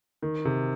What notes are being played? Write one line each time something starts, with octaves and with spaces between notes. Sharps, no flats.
D#3
C3